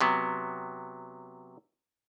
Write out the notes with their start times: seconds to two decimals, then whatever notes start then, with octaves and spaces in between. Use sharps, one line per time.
0.01 C3 F#3 B3